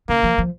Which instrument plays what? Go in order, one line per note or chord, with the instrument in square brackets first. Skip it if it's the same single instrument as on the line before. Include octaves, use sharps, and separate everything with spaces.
[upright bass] C#3 [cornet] A#3
[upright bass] F3
F3